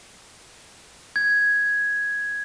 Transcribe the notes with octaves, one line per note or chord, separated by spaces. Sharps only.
G#6